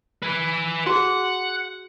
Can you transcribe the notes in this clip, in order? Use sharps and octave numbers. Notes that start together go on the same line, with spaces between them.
B4 G#5
F#4 G#4 F#5